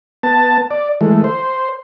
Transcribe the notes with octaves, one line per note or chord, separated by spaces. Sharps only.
B3 A5
D5
E3 G#3 A3
C5